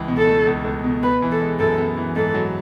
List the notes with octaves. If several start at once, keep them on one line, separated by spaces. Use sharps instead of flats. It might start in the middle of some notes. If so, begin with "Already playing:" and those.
Already playing: C#2 E3
B2
A4
A3
C#2
C#2
B2
B3 B4
E3
A4
G#3
F#2 A4
B3
E3
G#2 A4
F#3